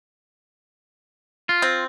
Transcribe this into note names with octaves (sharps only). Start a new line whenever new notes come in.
F4
C4